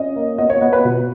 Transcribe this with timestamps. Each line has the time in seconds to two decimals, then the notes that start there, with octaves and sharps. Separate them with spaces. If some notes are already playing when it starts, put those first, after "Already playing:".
Already playing: C#4 D#5
0.16 A#3
0.38 B3 D#5
0.50 C#5
0.61 B3
0.73 B4
0.85 B2